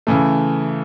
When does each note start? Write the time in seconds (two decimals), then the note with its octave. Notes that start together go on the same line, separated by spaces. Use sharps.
0.07 C#3 E3 A3